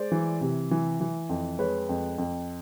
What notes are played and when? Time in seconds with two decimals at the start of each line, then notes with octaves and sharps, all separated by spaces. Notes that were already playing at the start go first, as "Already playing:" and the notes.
Already playing: G#3 C5 D5
0.12 E3
0.41 C3
0.71 E3
1.01 E3
1.29 F2
1.59 G#3 B4 C#5
1.89 F2
2.18 F2